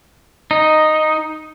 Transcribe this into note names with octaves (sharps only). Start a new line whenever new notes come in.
D#4